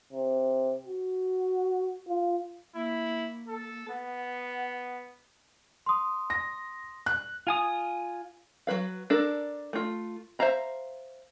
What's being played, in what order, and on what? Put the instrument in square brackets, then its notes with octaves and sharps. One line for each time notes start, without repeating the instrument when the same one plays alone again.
[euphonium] C3
F#4
F4
[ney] A#3 [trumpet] E4
[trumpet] A4
[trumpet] B3 [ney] F#5
[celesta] C6 D#6
[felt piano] A#6
F#6
[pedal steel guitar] F4 G#5 D#6
[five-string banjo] F#3 E4 B4 F5
D4 A4 A#4
A3 F4
C5 E5 F5 A#5 B5